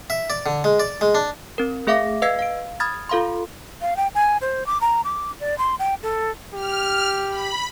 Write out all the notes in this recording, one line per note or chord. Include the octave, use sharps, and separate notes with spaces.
E5
D5
D3
G#3
D5
G#3
D4
C4 A#4
A3 G#4 E5 F5 D6 A#6
B4 D#5 F5 E6 G#6 C7
F5 D7
B5 D#6 F6 G#6 A6
F4 A4 F5 B5 C6
F5
G5
G#5
C5
D6
A#5
D6
D5
C6
G5
A4
G4 F6
B5